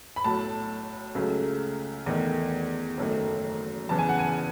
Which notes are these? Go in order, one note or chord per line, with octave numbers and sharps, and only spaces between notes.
B5
B1 A2 F#3 A5
C#2 C#3 F#3 A3
E2 D#3 A3
F#1 F#2 D#3 A3
E2 C#3 E3 A5
G#5
F#5
G#5